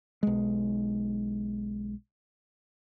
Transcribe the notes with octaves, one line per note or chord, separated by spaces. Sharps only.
B1 G#3